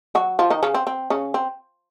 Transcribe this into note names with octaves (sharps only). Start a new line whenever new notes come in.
F#3 F#4
F3 F4
D#3 D#4
C#3 C#4
C4
C4
C#3 C#4
C4